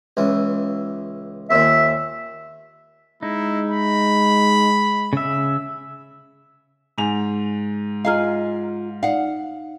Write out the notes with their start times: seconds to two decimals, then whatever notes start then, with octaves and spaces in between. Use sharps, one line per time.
0.17 C#2 E3
1.51 D#2 A#2 E5
3.23 G#3 D#4 E4
3.71 B5
5.13 C#3 E5
6.98 G#2 G#5 F7
8.05 F4 G#4 D#5 F5 A#5 F6
9.03 D#4 D5 F5 F#5